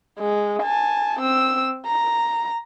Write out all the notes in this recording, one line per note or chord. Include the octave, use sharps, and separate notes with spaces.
G#3
G#5 A5
C4 E6
A#5